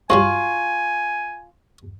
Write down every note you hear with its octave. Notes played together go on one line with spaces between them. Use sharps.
G2 F#3 G3 F4 G#5 C#6